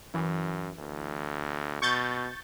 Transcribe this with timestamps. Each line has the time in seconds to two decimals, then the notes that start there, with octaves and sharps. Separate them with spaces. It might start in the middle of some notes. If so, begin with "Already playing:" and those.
0.14 F#2 E3
0.78 D2
1.82 B2 C#6 G6 A6